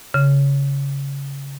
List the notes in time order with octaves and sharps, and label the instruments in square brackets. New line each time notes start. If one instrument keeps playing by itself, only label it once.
[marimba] C#3